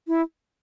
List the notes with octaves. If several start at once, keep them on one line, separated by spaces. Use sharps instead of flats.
E4